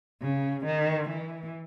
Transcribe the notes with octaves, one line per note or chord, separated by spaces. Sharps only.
C#3
D#3
E3